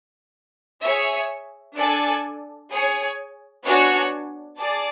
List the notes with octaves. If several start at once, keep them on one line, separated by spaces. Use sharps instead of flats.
G#4 C#5 E5 G#5
D4 A4 D5 G#5
G#4 C#5 G#5
B3 D4 F#4 C#5 G#5
G#4 D5 A5